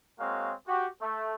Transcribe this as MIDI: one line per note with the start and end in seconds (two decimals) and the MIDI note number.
0.20 0.53 56
0.20 0.53 58
0.20 0.53 60
0.20 0.53 66
0.20 0.53 73
0.20 0.53 77
0.67 0.88 66
0.67 0.88 67
1.02 1.34 57